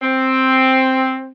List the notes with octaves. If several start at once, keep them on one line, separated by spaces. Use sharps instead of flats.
C4